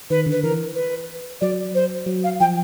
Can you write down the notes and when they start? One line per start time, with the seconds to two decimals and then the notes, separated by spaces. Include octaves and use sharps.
0.10 D#3 B4
0.26 D3
0.31 B4
0.43 E3 A#4
0.75 B4
1.41 F#3 D5
1.74 C5
2.06 F#3
2.24 F5
2.40 F3 G5